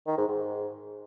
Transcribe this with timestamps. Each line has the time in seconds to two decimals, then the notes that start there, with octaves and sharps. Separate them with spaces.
0.07 D#3
0.17 G#2
0.28 G#2